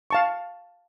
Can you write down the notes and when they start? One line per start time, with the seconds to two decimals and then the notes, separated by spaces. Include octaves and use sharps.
0.11 F5 A5 C#6